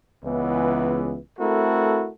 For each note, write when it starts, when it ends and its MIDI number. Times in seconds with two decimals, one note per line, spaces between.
0.24 1.17 37
0.24 1.17 52
0.24 1.17 59
1.39 2.09 57
1.39 2.09 60
1.39 2.09 64
1.39 2.09 66
1.39 2.09 69
1.39 2.09 70